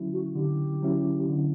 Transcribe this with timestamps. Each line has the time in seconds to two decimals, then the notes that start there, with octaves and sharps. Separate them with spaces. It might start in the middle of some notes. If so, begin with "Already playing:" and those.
Already playing: D3 F#3 C#4 E4
0.13 F#4
0.35 D3 G4
0.82 F#3 C#4 E4
1.29 D3